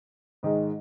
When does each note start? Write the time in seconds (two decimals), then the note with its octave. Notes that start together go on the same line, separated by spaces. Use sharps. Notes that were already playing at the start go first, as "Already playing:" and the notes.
0.43 G#2 D#3 G#3